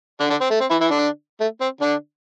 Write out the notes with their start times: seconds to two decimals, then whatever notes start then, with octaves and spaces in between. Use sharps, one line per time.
0.20 D3 D4
0.30 D3 D4
0.41 C4
0.51 A3
0.60 C4
0.70 E3 E4
0.81 E3 E4
0.91 D3 D4
1.40 A3
1.61 C4
1.81 D3 D4